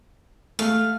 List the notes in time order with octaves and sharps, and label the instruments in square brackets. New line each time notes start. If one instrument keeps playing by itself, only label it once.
[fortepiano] A3 [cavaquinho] F5